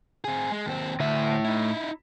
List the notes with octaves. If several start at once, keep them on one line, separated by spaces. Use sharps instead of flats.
C4 G#4
G#3
D#2 C4
D2 A2 E5
D#4 E4